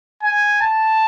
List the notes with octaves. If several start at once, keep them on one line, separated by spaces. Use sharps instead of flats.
G#5
A5